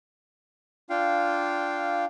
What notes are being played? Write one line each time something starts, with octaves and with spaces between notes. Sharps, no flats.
D4 F4 F5 G5